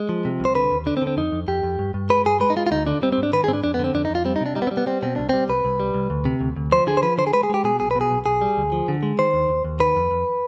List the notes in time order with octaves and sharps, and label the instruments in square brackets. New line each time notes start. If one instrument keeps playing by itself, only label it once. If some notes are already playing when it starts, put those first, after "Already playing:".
Already playing: [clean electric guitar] G#3
F3
C3
C2
C5
D3 B4
D#2
D3 D4
C4
D3
C4
F2 D#4
F2
F2 G4
F2
G2
G2
G#3 B4
G2 G#4
G#3 B4
D#4
G#3 F4
F4
D2 D#4
D3 D4
G3 C4
C4
G#2
D4
D#3 B4
G#4
G#2 C4
D4
F2 D4
B3
D3 C4
F2 D4
D#4
F2 F4
G3 C4
D#4
C3 D4
G3 D#4
B3
C4
G3
B3
G3 C4
B2 C4
C2 D4
G3 C4
C2 B4
C2
G3
C2
D2
C3
D2
D2
F3 C5
D3 G#4
C5
F3 B4
D3 C5
G#4
G#3 B4
G#4
G#3 G4
B2 G#4
B1 G#4
B4
B2
G#4
B1
B1 G#4
G3
D2
F3
D3
G#3
D#3 C5
D#2
D#2
D#2
D#3 B4
F2
F2